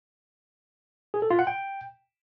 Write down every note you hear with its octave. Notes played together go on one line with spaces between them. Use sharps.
G#4
A4
F4
F#5
G5